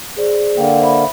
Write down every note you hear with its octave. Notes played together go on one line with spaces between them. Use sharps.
G#4 C5 D5
D3 A#3 F5 G5
C5 E5 B5